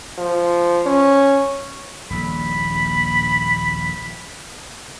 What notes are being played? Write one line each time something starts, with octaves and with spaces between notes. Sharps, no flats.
F3
C#4
D#1 A#1 G3 B5